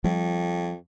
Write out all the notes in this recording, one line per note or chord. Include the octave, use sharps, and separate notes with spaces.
F2 F3 G3